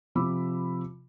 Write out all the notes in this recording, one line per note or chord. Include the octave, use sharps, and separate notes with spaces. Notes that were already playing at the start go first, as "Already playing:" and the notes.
C3 F3 B5 D6 E6